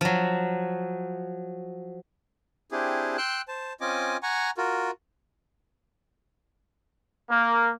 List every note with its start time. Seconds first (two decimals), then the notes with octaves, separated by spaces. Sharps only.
0.01 F3 F#3
2.71 C4 D4 E4 G4 G#4
3.18 G5 C6 E6 F#6
3.48 C5 A5
3.81 C4 C#4 F4 D#5 G#5 D6
4.23 F#5 G#5 A#5 C#6
4.57 F4 F#4 A#4
7.30 A#3